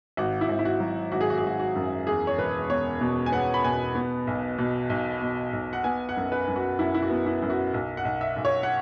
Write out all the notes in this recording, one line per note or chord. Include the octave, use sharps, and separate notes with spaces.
G#1 F#4
E4
G#1
E4
F#4
F#3
G#1 F#4
G#4
F#4
G#4
G#1 F#4
F#4
F#2
E2 G#4
C#5
E1 B4
B3 C#5
B2
G#5
B3 F#5
B5
B2 G#5
B3
B1
B2
B1
B2
B1
F#5
B3 G#5
F#5
F#2
B4
F#2
F#4
F#2 E4
E4
F#4
B3
E4
F#2
F#4
B1
F#5
B1
E5
B1
C#5
F#5